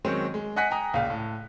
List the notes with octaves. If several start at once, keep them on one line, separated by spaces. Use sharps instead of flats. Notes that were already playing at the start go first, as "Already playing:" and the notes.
D#3 F#3 G#3 C4 C#4
G#3
D#5 F#5 G#5 F#6 A#6 B6
G5 G#5 A#5 D#6
C#2 A#2 C#3 F5
A2